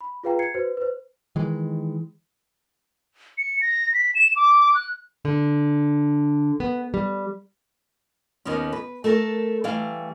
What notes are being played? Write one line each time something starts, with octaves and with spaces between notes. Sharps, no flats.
B5
F4 G#4 B4 F5 G5 A#5
G#6 C7 C#7
F#4 B4 C5
B4 C5
D#3 E3 G#3
C#7
A#6
B6
E7
D6
F#6
D3
B3
G3
D#2 D#3 B3 C#4
B4
A3 A4 A#4
E3 G3 A3 F5